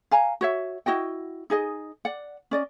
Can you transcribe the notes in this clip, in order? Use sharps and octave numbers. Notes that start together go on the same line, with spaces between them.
F5 G#5 A#5
F#4 C#5 E5
E4 F#4 D#5 G5
D#4 G#4 D#5
D5 F#5
C#4 D5 D#5